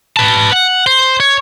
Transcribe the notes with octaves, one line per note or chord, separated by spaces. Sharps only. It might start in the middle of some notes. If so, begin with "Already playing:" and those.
B4 A5
F#5
C5
C#5